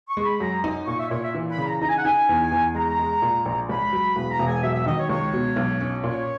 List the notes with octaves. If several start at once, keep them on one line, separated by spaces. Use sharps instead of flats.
C#6
G#3
B5
F#2 A#5
D#4
A#2 C#6
E5
A#2 C#5
E5
E3
B5
C#3
A#5
D#4 A#5
G#5
F#5
D#4 G#5
E2
E2
G#3 A#5
G#3
A#2
A#1
C#2 B5
F#3
E1 B5
A#5
E1
G#5
F#3 E5
E5
D#3 D#5
C#5
C#2 C#5
B2
B1
C#4
A#2 C#5